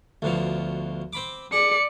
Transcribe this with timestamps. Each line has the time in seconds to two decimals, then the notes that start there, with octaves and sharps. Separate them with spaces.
0.22 D2 B2 F3
1.13 C4 B5 D6
1.53 G#4 D5 C#7